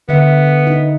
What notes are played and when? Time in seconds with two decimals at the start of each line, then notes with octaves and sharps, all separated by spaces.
0.09 D3 B3 E5
0.67 D#4